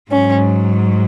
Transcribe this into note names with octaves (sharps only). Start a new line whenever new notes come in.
G#2 F#3 C#4